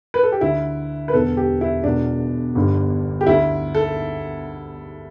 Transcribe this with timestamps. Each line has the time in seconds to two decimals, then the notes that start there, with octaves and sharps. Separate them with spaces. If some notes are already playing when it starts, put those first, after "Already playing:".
0.14 B4
0.23 A4
0.32 G4
0.41 D2 D3 E4
1.08 B4
1.13 E1 E2 D3 A4
1.37 G4
1.61 E4
1.84 E1 E2 B2 D4
2.55 G1 G2 D3
3.21 G4
3.27 D2 D3 E4
3.74 A4